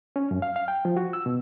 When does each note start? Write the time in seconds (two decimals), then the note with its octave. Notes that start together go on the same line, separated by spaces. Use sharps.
0.16 C#4
0.31 F#2
0.42 F5
0.56 F5
0.68 G5
0.85 F3
0.97 F#4
1.13 E6
1.26 B2